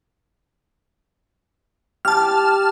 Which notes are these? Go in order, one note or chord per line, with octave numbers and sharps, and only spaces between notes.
G4 A5 F6